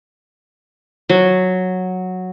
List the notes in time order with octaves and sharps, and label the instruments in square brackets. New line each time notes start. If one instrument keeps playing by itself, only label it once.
[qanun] F#3